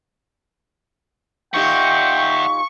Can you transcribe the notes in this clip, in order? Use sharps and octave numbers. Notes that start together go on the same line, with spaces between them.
A#2 D#4 G4 E5 F#5 G5 C#6